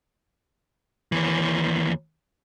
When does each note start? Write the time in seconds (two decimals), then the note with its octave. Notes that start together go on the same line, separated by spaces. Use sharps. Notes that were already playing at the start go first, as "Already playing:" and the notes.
1.12 D#2 E3